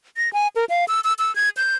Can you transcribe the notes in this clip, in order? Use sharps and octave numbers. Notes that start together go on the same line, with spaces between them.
A#6
G#5
A#4
F5
E6
E6
E6
G#6
G6